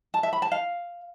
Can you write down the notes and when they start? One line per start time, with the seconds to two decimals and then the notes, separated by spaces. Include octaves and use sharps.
0.14 A5
0.23 E5
0.33 B5
0.42 A5
0.52 F5